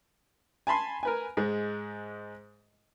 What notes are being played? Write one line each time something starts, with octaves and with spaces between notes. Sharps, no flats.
G#5 A5 B5 C6
A#4 B4 G#5
G#2 G#3